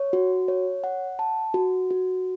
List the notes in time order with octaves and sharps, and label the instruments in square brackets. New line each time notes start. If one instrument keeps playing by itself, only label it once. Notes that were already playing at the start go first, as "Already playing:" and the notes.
Already playing: [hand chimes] C#5
F#4
C#5
F#5
A5
F#4
F#4